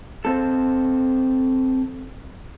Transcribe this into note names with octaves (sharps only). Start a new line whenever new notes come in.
C4 A4